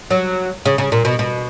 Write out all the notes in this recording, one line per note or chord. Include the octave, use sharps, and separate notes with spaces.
F#3
C#3
C#3
A#2
B2
B2